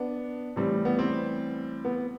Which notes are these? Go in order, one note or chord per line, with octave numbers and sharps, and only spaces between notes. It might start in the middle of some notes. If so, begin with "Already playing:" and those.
Already playing: B3 D4
A2 E3 G3 C4
B3
C4
B3